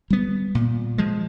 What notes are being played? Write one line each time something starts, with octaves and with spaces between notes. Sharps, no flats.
G3 B3
A#2
F3 G#3